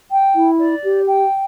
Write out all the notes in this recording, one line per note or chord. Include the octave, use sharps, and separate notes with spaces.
G5
E4
D5
G4
G5